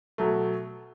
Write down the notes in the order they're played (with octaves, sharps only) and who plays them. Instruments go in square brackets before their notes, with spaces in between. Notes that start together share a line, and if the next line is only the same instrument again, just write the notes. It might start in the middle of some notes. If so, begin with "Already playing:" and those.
[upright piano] B2 F#3 A3